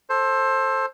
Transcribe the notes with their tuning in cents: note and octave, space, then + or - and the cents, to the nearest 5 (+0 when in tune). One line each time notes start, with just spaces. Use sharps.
A4 +0 C5 +20